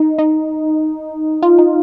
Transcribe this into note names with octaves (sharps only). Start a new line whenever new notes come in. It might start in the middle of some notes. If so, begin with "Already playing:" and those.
Already playing: D#4
D#4
F4
D#4